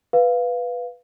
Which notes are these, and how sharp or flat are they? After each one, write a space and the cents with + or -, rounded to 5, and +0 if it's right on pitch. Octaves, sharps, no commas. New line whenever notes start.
B4 +0 F5 +0